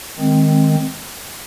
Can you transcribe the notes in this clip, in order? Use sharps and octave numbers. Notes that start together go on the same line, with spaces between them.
D#3 G#3 C4